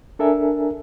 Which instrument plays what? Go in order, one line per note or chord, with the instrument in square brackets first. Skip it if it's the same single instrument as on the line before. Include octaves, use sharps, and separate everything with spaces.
[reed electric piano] D4 A4 A#4 E5 G#5